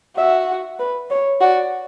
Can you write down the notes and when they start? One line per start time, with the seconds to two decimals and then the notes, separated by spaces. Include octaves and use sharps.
0.18 F#4 E5
0.79 B4
1.10 C#5
1.41 F#4 D5